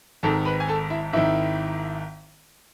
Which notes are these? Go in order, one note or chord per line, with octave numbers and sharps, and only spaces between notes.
G#1 G#2 D#3 A4 A5
B4 B5
G#5
A4 A5
E4 E5
G#1 G#2 D#3 E4 E5